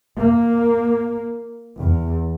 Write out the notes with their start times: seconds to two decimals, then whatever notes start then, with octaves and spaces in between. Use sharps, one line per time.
0.17 A#3
1.79 E2